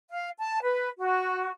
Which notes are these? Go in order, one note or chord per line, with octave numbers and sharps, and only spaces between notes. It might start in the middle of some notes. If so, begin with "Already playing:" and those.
F5
A5
B4
F#4